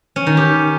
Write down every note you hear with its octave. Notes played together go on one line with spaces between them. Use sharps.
C#4
D#3
G4